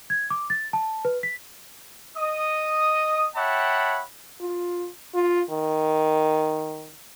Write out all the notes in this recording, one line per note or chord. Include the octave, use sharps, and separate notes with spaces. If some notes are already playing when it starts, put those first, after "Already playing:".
G#6
D6
A6
A5
B4
B6
D#5 D#6
C#5 E5 F#5 G5 A5 B5
F4
F4
D#3